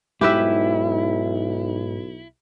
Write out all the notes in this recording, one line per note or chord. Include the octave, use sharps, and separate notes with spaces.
B1 G#2 E4 G4 B4 E5